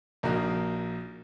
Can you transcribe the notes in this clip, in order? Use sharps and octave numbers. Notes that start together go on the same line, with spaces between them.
A#1 A#3 D#4 F#4 A#4